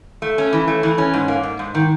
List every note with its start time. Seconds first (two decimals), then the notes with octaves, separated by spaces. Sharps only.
0.22 A3
0.38 C#4
0.53 E3
0.68 A3
0.83 E3
0.98 C#4
1.13 G#2
1.28 A#3
1.43 G#2
1.59 G#2
1.75 D#3